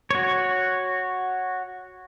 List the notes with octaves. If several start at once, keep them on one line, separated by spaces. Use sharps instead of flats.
F#4 C#5